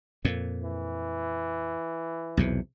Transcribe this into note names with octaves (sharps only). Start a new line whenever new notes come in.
F2 A#2
E3
B1 E2 C3